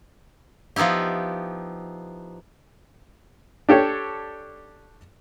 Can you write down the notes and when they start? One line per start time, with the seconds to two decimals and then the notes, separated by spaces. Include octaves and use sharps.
0.76 F3 B3 D#4 E4 G4
3.69 D4 G4 A4 C#5